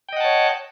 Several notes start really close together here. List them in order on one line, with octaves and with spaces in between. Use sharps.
G5 D#5 F#5 A5 C#5